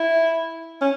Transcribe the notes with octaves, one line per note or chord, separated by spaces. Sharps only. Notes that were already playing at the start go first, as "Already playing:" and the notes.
Already playing: E4
C#4